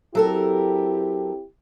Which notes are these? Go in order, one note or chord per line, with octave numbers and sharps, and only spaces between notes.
F#3 C4 E4 G4 A4 A#4